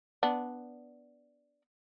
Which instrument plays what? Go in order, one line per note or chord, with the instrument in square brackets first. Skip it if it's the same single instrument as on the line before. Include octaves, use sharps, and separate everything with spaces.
[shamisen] B3 D4